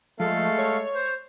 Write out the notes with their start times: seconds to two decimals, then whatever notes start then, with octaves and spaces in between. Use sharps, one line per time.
0.20 F3 G#3 A3 A4 F5
0.58 C#5
0.95 C5